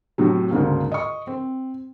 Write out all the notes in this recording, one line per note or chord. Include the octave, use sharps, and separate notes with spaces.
A2 C3 F#3
D2 G#2 C#3 A#3
D#5 C#6
C4